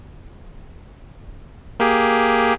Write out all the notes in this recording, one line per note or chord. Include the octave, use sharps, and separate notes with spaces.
A#3 G4 G#4